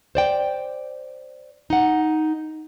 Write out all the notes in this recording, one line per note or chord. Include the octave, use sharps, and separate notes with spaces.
C5 D5 G5
D#4 F#5